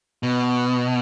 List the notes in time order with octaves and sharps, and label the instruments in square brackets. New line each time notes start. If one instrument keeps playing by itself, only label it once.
[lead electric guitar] B2